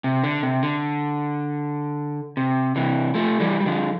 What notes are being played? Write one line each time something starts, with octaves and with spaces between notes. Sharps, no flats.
C3
D3
C3
D3
C3
C3 E3
F3 A3
E3 G3
G3
D3 F3